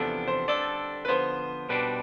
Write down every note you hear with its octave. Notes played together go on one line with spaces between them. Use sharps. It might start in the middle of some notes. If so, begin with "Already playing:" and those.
Already playing: E2 C3 F3 B3 D4 A4
C5
D3 G3 D4 A4 D5
B4
D3 F3 B3 C5
B2 G3 D4 B4